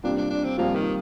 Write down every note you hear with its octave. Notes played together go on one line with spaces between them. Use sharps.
C3 G3 A#3 D4 F4
D4
D4
C4
C3 F3 G3 A#3 F4
D#3